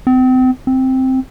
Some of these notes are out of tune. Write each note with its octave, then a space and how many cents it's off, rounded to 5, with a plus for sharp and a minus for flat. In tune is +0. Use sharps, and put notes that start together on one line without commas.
C4 -35
C4 +0